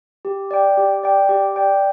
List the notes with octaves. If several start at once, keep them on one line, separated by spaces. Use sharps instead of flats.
G4
D5 G5
G4
D5 G5
G4
D5 G5